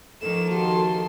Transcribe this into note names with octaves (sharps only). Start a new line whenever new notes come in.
D#3 F3 A#3 A4 E7
F#4 G4 A5 C6